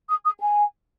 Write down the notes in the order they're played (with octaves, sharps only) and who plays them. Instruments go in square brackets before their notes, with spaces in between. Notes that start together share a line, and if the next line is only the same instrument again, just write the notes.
[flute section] D#6
D#6
G#5